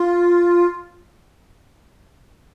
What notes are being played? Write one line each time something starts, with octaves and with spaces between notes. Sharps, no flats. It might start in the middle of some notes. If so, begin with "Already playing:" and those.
Already playing: F4